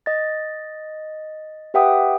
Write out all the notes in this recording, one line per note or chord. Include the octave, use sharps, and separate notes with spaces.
D#5 A6
G4 B4 E5 F#5 G5 D#6